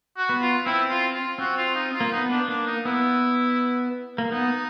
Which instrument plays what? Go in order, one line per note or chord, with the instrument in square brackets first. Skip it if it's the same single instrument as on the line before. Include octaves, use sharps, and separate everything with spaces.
[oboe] F#4
[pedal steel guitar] B3
[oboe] F4
[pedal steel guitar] C4 [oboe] E4
[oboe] F4
F4
[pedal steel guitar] C4 [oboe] F#4
[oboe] F4
D#4
F4
[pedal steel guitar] A#3
[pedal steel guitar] B3 [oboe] D#4
[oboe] D4
[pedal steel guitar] A#3 [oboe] D4
[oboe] D#4
[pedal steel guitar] B3 [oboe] E4
[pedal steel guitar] A#3
[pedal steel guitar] B3 [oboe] D#4